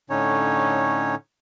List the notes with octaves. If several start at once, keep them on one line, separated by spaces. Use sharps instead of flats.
A2 D3 C#4 D#4 C#5